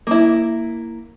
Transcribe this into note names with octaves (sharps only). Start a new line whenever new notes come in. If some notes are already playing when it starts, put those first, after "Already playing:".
A#3 E4